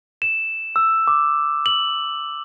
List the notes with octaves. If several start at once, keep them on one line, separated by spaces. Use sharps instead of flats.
E7
E6
D6
F#7